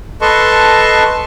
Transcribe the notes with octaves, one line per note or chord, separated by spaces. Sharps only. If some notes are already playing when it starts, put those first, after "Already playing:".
A4 B4 D#5 A5 C6 C#6